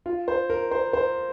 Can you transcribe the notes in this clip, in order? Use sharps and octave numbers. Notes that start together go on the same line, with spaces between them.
F4
C5
A#4
C5
C5